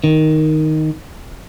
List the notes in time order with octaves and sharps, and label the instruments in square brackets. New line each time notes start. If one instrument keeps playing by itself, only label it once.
[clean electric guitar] D#3